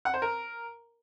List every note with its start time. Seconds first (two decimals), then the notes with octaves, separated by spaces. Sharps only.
0.05 F#5
0.14 C5
0.22 A#4